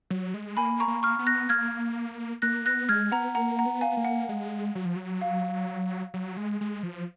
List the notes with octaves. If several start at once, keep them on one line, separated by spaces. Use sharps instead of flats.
F#3
G#3
A#3 G#5 B5
A#5 C#6
A#3
C#6 F6
B3
F#6 A#6
A#3 F6 G#6
A#3 F#6 A#6
B3 F#6 A#6
G#3 F6 G#6
B3 F#5 A#5
A#3 F#5 A#5
F#5 A#5
B3
F5 G#5
A#3
F#5
G#3
F#3
F3
F#3
F5
F#3
G#3
G#3
F3